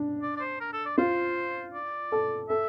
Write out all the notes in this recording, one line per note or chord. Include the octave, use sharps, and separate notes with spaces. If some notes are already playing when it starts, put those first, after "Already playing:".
Already playing: D4
D5
D5
C5
A#4
A4
D5
F4 C5
D5
A4
A4 E5